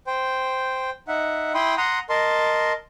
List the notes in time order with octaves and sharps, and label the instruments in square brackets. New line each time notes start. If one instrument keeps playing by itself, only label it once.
[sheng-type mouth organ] C5 G5
D#4 E5 F#5
E4 G5 B5 C6 D#6
F#5 A#5 C6 D#6
A#4 D#5 A5 C6